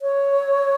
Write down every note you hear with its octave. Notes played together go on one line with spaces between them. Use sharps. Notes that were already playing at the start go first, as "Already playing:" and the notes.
C#5